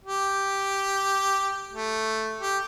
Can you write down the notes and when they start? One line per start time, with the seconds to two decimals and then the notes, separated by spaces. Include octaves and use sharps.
0.04 G4
1.72 A3
2.40 G4